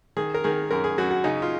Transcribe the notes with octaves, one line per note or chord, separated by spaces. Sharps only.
D#3 G#4
A#4
D#3 G#4
F#2 A#4
G#4
F#2 F#4
F#4
C#3 D#4
F4